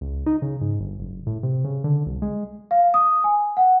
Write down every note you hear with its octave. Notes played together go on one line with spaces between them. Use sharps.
C#2
D#4
C#3
G#2
G1
F#1
A2
C3
C#3
D3
C2
G#3
F5
D#6
G#5
F#5